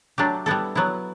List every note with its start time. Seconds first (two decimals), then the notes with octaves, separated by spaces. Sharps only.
0.18 F#3 A3 D4 G4
0.46 G3 B3 E4 A4
0.75 F#3 B3 E4